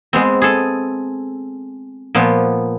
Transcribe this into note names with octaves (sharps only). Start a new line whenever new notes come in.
G#3 B3 C4
G#4 A4
A#2 F3 B3